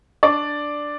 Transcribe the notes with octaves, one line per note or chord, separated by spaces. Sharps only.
D4 D5